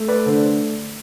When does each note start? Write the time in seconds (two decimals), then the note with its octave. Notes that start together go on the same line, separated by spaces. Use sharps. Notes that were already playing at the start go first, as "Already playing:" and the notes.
Already playing: A3
0.08 B4 D5
0.25 D3 A4 C5